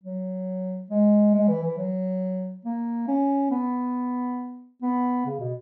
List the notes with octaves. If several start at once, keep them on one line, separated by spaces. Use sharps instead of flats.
F#3
G#3
G#3
E3
E3
F#3
A#3
C#4
B3
B3
C#3
B2